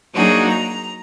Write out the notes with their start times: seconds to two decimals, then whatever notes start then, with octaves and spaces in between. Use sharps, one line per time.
0.12 F#3 A#3 D4 D#4 F#4 G#4
0.49 A#5